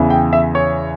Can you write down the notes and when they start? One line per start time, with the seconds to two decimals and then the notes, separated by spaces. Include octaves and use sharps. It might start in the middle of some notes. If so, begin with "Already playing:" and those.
Already playing: E2 C#3 E3
0.10 G5
0.33 E5
0.55 C#5